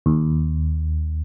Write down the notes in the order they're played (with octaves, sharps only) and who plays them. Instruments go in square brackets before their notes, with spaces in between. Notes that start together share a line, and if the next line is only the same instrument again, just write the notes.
[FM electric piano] D#2